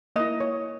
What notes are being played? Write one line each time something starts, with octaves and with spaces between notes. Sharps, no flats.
A#3 E4 D#5
C#5